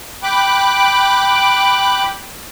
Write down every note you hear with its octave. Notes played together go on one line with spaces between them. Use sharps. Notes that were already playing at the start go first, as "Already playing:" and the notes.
G5 B5 D6 F#6